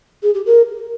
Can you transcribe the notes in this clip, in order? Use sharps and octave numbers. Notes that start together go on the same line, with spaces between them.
G#4
G4
A#4